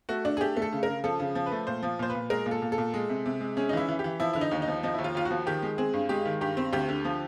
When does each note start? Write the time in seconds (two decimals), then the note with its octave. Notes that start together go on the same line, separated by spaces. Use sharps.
0.09 A3 F#4
0.25 D4
0.37 G#4
0.41 A3 G4
0.57 A3
0.62 A4
0.73 C#3
0.83 A#4
0.88 C#3
1.04 F3 A4
1.20 C#3
1.35 F3
1.46 B4
1.52 A3
1.67 A#2 C5
1.83 F3
1.99 A#2 C5
2.10 B4
2.15 A#2
2.30 G#3 A#4
2.46 A#2
2.51 A4
2.62 A#2
2.72 A4
2.78 A#2
2.94 G#3
3.09 C3
3.26 C3
3.40 G#3
3.57 C#4 G#4
3.69 D#4
3.73 E3 E4
3.88 E3
3.99 G4
4.04 E3
4.20 F3 E4
4.33 D3 E4
4.41 D#4
4.51 D#2
4.62 D#4
4.68 F3
4.83 F3 D#4
4.94 D#2 E4
5.04 F4
5.15 D#2 F4
5.25 F#4
5.31 F3
5.46 D#3 G4
5.62 G#3
5.78 C4 G#4
5.94 G2
6.09 G#3 G4
6.26 D#3
6.41 G2 G4
6.57 C4
6.73 D2 G4
6.88 D3
7.05 F3